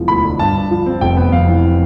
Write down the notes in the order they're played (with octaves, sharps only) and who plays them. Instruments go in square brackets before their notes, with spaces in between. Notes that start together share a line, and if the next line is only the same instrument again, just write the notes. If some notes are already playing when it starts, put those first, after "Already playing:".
Already playing: [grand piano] E1 E3 F3
D2 B5
D3
G2 A5
G2
F3
C4
F1 G5
B3
F2 F5
E3